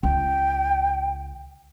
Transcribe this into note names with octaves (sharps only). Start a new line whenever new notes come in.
C#2 G5